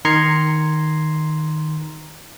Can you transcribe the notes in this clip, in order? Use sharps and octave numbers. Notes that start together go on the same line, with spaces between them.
D#3 A#5 C6 G#6 C7 C#7